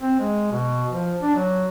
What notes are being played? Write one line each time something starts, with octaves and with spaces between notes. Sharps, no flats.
C4
G#3
B2
F3
D4
F#3